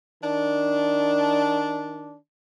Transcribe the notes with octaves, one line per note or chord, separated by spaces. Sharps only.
D#3 D4